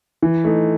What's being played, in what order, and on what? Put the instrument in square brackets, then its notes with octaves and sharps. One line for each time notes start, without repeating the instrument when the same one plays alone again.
[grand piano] E3
A3 D#4